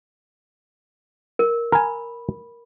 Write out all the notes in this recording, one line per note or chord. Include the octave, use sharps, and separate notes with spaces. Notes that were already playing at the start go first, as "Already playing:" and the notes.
A#4
A#4 G#5 B5